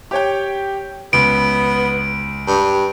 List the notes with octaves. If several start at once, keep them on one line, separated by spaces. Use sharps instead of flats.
G4 C#5 G5
C#2 B3 D7
G2